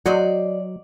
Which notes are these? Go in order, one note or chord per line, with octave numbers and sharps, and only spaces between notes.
F#3 F#4 C5 D5 D#5 F#5